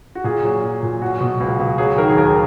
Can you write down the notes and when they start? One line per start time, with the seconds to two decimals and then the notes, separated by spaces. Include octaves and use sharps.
0.15 F#4
0.24 A#2 G#4
0.44 F#3
0.63 F#3
0.82 A#2
1.02 F#3 F#4
1.20 B2
1.41 C#2
1.59 C#2
1.78 F#3 G#4
1.98 D#3 A#4
2.09 G#4
2.17 D#2 A#4